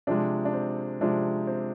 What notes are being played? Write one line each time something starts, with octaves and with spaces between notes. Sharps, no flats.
C3 F3 G#3 D4
D4
C4
C3 F3 G#3 D4
C4